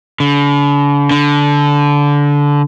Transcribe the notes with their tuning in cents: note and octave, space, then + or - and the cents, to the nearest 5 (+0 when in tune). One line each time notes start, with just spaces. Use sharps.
D3 -45
D3 -20